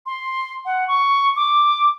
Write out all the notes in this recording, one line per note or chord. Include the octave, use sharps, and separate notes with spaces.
C6
F#5
C#6
D6